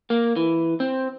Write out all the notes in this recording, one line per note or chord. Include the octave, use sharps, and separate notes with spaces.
A#3
E3
C4